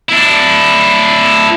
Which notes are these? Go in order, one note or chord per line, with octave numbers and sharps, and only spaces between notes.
D4 E4